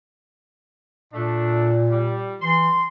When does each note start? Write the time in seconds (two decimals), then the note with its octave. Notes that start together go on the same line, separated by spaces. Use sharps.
1.13 A#2 A3 D4
1.91 G3
2.42 E3 C6